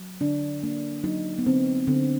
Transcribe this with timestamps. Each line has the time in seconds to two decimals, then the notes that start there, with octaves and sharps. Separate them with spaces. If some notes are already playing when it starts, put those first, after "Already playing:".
Already playing: F#3
0.21 D3 D4
0.63 A#3 D4
1.04 F#3 D#4
1.38 B3
1.46 D3 C4
1.87 D3 C4